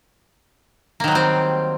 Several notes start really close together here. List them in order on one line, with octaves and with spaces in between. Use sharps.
A#3 D#3 F#3 G3 C4